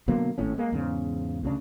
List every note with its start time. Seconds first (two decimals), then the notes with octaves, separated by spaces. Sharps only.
0.08 B2 D3 F#3 A#3
0.38 G#1 A2 C#4
0.58 G#3 A#3
0.72 E2 G#2 C#3
1.43 D2 C#3 D4